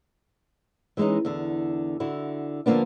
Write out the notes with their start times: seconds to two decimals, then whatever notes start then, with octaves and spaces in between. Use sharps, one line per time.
0.97 E3 G#3 A#3 C#4 D#4
1.25 E2 D3
2.00 D3 E4 F#4
2.66 D3 F3 G#3 A#3 B3 D4